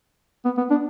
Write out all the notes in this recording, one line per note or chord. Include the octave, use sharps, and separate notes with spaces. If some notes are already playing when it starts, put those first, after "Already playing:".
B3
B3
D4